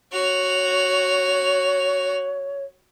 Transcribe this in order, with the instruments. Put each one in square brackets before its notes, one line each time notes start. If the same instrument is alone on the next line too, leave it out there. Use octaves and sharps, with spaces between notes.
[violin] F#4 F7 [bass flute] C#5